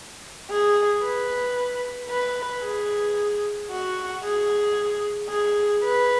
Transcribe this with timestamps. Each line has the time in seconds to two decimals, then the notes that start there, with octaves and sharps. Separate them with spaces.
0.50 G#4
1.04 B4
2.10 B4
2.63 G#4
3.70 F#4
4.24 G#4
5.29 G#4
5.84 B4